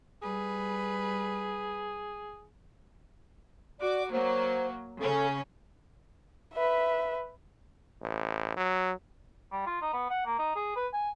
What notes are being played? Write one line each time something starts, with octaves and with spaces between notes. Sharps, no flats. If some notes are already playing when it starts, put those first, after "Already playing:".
G3 G#4 B4
F#4 D5 D6
F#3 A#3 C5
C#3 C#4 A4
B4 E5
A1
F#3
G3
F4
D#4
B3
F#5
A#3
D#4
G#4
B4
G#5